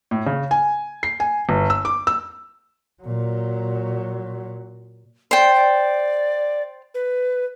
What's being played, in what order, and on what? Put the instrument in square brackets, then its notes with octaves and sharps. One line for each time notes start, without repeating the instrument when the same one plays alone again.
[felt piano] A2
C#3
G#5
C7
G#5
G1
E6
D6
E6
[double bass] A#2 F#3
[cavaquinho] C5 G5 [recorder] D5
[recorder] D5
B4